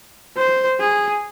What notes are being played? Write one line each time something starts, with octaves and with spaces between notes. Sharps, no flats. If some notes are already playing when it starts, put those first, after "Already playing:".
C5
G#4